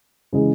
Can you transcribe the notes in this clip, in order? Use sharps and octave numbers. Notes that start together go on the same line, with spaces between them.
C#3 E3 G#3